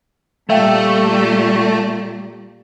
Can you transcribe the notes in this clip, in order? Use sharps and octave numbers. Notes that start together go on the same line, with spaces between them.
A#2 G3 A3 E5 F5 G5